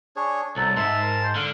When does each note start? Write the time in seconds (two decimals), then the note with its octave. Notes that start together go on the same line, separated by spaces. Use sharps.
0.16 D4 G#4 C#5
0.56 C2 F#3 A4
0.77 G#2 E5 A5 C6
1.02 A#4
1.24 C5
1.35 D3 F5